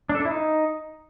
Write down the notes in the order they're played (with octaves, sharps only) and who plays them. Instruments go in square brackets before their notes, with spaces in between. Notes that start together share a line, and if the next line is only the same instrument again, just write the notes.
[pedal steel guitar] D4
A4
D4
E4
D#4